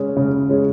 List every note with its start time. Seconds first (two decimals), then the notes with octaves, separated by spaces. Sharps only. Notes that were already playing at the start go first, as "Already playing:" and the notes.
Already playing: C#3 G#3 C#4 G#4
0.17 C#3
0.49 G#3 C#4 G#4